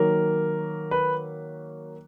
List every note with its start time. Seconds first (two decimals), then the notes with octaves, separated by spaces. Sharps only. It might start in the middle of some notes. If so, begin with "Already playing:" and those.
Already playing: D#3 F#3 A#3 A#4
0.91 B4